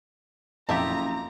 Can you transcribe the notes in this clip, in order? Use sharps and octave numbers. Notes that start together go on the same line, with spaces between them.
F#1 F2 G4 E5 A5 A#5